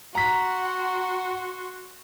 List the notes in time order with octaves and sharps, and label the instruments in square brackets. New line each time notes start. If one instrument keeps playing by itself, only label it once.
[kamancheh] F#4 C6 [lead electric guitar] F#5 [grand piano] A#5 B6